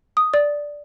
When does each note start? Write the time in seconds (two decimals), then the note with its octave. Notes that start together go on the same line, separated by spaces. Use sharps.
0.17 D#6
0.34 D5